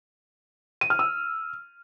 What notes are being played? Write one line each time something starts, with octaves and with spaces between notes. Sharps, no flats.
D#7
F6
E6